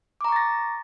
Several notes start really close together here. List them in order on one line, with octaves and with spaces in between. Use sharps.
D6 A#5 C#6 A6 A#6